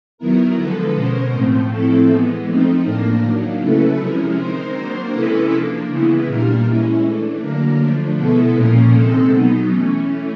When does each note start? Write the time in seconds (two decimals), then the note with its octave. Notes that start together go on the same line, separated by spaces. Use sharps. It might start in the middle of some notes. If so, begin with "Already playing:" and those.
0.18 D#3 F#3 B3 E4 A#4
0.56 D3 F3 G#3 A4 B4
0.94 B2 G#3 C#4 A#4 C5
1.32 A2 F3 A3 C4
1.70 A2 F3 A3 C4 E4 A4
2.08 E3 G#3 B3
2.46 F3 A3 C4 D#4
2.84 A2 F3 A#3 D4 A#4
3.23 D#3 F#3 A#3 D4
3.61 C#3 F#3 A3 C#4 E4 A4 B4
3.99 C3 F3 G#3 C#4 E4 A#4
4.37 D#3 G#3 C4 D#4 A#4 C5
4.74 D#3 F#3 A#3 D4 A#4 C5
5.12 C3 E3 G#3 C#4 E4 A4 B4
5.50 F3 A#3 D4
5.88 C#3 E3 G#3 B3 E4
6.26 A#2 G3 A#3 D4 A#4
6.64 E3 G#3 C#4 E4
7.02 E3 A3 D4
7.40 D3 F#3 A#3 D4 A#4
7.79 D3 F3 A3 D4
8.16 B2 G#3 B3 E4 A4
8.55 A#2 F3 A#3 C#4 A#4
8.92 C3 D#3 G#3 C4 A4
9.31 B2 F#3 B3 D#4
9.69 E3 A3 C#4